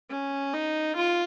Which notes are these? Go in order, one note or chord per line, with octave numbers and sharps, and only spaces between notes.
C#4
D#4
F4